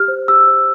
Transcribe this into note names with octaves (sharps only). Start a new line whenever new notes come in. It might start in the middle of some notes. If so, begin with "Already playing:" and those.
Already playing: G4 F6
C5
G4 E6
C5